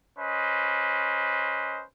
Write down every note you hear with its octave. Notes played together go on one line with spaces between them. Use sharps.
C#4 B4 C5 D#5